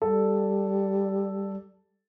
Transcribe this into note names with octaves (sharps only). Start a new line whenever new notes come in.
G3 A4